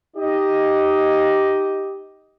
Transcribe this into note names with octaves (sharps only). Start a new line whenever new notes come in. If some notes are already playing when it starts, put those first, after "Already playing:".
D#4 G4 D#5